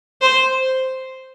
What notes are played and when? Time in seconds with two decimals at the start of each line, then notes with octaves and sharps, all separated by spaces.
0.22 C5